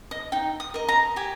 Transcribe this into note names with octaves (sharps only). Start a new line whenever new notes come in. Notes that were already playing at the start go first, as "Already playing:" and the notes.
D#5
D#4 G5
D#6
A#4 D#5
A#5
G4 G#5